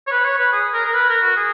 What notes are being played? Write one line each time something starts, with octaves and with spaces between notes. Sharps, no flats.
C#5
B4
C#5
B4
G#4
A#4
A#4
B4
A#4
F#4
G#4